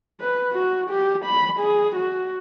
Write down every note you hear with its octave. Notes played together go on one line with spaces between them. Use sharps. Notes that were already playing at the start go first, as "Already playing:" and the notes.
B4
F#4
G4
B5
G#4
F#4